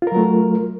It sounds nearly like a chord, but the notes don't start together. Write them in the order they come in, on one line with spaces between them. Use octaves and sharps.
F4 A#4 F#3 A3